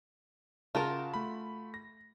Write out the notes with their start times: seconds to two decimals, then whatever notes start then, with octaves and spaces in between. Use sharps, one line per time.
0.75 C#3 F4 F#4 A#4 A5
1.14 A3 B5
1.74 A#6